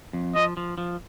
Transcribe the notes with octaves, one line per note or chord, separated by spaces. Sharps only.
F2
F3 D#5
F3
F3